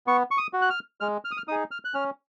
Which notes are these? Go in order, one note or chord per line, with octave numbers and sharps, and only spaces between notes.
B3 C#6
C#6
D#6
F#4
F#6
F6
G#3 F6
F6
D#6
F6
D#4 G#4 D#6
F6
F#6
C#4 F6